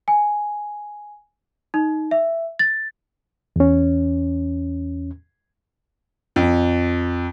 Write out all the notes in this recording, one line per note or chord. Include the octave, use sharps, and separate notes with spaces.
G#5
D#4
E5
A6
E2 C#4
F2